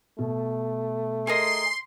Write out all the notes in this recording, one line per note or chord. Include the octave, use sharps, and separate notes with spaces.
B2 A3
G#4 A#4 D#5 C6